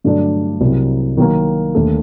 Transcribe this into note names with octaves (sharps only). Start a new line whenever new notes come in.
G2 D3 F#3 A3 D4
C2 C3 F#3
D#3 F#3 A#3 F#4 A#4
D#2 D3 A3